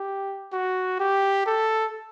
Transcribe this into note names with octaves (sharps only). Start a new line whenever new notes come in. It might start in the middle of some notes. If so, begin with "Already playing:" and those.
Already playing: G4
F#4
G4
A4